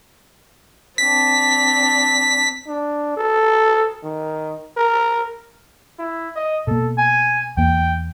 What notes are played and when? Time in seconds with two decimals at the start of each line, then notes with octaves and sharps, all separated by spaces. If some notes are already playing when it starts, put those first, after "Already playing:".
0.98 C4 D4 B6
2.68 D4
3.17 A4
4.04 D#3
4.77 A#4
5.99 E4
6.36 D#5
6.67 B2 A#3 A4
6.98 G#5
7.57 E2 A#3 G5